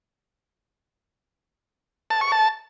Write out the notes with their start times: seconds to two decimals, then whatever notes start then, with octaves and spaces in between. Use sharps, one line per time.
2.10 A5
2.21 C#6
2.32 A5